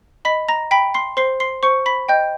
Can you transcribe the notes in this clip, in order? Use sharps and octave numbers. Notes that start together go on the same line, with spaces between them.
D#5 B5 B6
A#5 A#6
G5 B5 B6
C6 C7
C5 C6 C7
C6 C7
C5 C#6 C#7
B5 B6
D#5 G5 G6